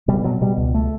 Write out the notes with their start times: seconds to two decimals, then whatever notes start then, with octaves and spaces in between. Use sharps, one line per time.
0.08 B2 G3
0.24 B2 F#3
0.41 B2 G3
0.57 C#2
0.74 A3